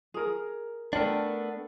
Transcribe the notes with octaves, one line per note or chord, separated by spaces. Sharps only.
G#4 A#4
A3 B3 D4 A#4 G5